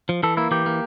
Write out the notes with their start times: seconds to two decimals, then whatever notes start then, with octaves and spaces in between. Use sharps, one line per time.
0.09 F3
0.23 E3 A4
0.37 A#3 E4
0.51 E3 G4
0.66 A#3